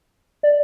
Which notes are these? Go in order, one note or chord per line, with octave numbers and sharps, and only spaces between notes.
D5